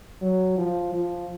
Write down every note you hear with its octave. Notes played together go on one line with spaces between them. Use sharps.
F#3
F3
F3